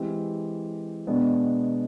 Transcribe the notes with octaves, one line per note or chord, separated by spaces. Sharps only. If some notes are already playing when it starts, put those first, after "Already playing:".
Already playing: E3 G#3 C4 E4 G4
B2 G#3 B3 D4